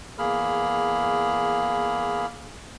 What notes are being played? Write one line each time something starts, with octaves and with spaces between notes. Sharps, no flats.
E2 A#3 G#4 B5 F6